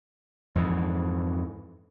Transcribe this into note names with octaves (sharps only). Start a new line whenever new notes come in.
F2 G#2 E3